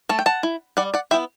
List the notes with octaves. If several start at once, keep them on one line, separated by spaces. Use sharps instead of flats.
A3 A5
G5
F#5 A5
E4
G3 D5 F#5
D5 F#5
B3 E4 E5 G5